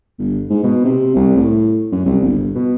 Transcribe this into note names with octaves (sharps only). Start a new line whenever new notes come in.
G1
G#2
B2
C3
C2
A2
F#2
C2
G1
B2